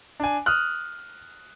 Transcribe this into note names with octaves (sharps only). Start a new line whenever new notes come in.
D4 G#5
D#6 F6 F#6